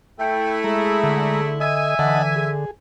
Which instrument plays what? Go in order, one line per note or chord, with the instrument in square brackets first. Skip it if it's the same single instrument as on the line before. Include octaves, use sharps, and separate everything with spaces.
[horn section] A3 E4 [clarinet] G5
[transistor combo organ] G#3 A#5 [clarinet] G#4
[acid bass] D3
[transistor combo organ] D#5 [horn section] E5 G#5
[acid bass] D3 [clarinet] E3 [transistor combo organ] D#5 F#5 A5
[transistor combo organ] G#4